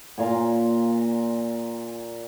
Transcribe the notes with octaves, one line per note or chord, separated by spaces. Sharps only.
A#2 F5 G#5